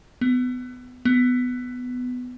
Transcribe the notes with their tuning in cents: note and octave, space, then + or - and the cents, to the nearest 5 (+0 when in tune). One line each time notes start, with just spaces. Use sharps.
B3 +25
B3 +15